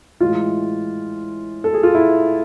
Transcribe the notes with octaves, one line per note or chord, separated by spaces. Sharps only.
A2 E3 G#3 F4
A4
G#4
F4
E4